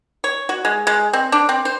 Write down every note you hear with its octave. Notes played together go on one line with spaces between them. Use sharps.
C#5
F#4
G#3
G#3
C4
D4
C4
C5